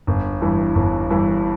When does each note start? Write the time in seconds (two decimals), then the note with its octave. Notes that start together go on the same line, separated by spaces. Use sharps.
0.07 G1
0.41 G2 E3
0.75 G1
1.10 G2 E3